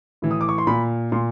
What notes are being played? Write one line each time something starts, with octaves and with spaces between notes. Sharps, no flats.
A2 E3
D#6
D6
C#6
C6
A#2 B5
A#2 C6